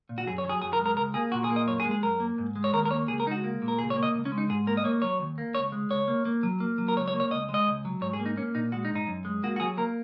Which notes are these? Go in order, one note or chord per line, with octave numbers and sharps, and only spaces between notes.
A#2
F#4
F#2 G#4
C#5
F#3
G#4
F#2 G#4
A#4
G#3
A#4
C#2 A#4
A#3 G#4
A#2 F#4
G#4
A#3
D#5
F#2 C#5
G#4
G#3
G#4
F#2 A#4
A#3
G#2
G#3
C#5
D#2 A#4
A#4
A#3 C#5
C#2 G#4
A#4
G#3 D#4
F#4
A#3
A#2
A#4
C#2 G#4
C#5
A#3
D#5
C#2
C#4
G#3
D#4
G#2 G#4
A#3 A#4
D#5
A#3 C#5
F#3 C#5
D#2
A#3
C#2 C#5
G#3
C#2 C#5
A#3
A#3
F#3
A#3
F#3
A#4
C#2 C#5
C#5
A#3
C#5
C#2 D#5
G#3
D#5
C#2
F#3
G#2 C#5
G#4
A#3
D#4
A#3 C#4
A#2 D#4
G#3 F#4
D#4
G#2
D#4
F#2
G#3
A#3 F#4
F#4
F#3 G#4
A#3 A#4